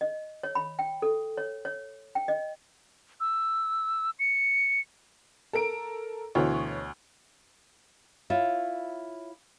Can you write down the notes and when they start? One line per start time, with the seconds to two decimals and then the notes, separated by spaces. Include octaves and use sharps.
0.01 D#5
0.43 C#5
0.55 B5
0.79 G5
1.02 A4
1.37 C#5
1.65 C#5
2.15 G5
2.28 D#5
3.20 E6
4.19 C#7
5.53 A4 A#4 D7
6.35 D2 B2 E3 C#5
8.30 E4 F4 C#5 E5